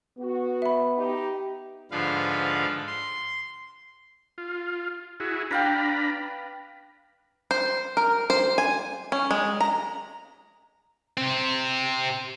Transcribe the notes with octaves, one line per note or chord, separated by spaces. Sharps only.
B3 F#4
E5 B5
D#4 G4
G#2 D3 F3 B4 F5
C6
F4
E4 F#4 G#4
D4 B4 F5 G5 A#5 B5
C5
A#4
C5
G#5
C#4
G#3
A#5
C3 C4